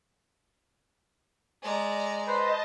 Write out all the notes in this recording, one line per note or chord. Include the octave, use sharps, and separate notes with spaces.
G#3 D5 A#5
B4 C5 D#5 A5